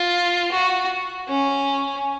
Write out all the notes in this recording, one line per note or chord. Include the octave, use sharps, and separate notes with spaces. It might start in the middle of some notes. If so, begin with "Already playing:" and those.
Already playing: F4
F#4
C#4